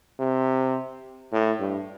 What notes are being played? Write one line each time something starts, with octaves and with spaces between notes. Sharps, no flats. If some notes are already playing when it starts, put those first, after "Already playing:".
C3
A2
G2